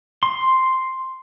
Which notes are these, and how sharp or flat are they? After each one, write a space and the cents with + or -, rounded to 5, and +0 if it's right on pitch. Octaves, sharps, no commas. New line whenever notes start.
C6 +0